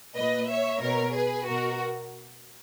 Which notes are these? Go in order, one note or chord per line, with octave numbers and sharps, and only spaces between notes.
A#2 B4 D#5
C#5 E5
B2 A#4 C#5
G#4 B4
B2 F#4 A#4